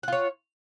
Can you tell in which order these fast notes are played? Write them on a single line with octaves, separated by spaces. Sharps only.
F#5 F4 C#5